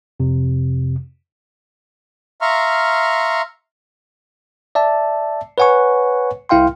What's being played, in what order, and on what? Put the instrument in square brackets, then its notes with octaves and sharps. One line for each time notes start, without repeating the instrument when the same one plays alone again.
[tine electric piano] F2 C3
[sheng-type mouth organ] E5 F5 A#5 C6 C#6 F6
[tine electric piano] D5 E5 A5
B4 C#5 F#5 G#5 C#6
C2 E4 F5 G5 C6